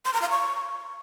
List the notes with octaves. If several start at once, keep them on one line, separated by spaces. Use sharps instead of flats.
C6
A#5
F5
C#6